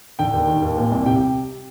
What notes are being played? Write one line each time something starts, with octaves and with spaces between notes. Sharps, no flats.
D3 G5
D#2
D#3
D#2
A#2
C2
C3 G5